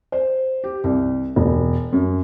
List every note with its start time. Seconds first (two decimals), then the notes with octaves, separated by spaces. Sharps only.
0.12 C5
0.64 G4
0.84 C2
1.36 E1
1.93 F#2